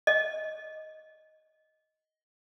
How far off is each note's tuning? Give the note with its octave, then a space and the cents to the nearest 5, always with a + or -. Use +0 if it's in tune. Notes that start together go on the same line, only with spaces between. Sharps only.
D#5 +10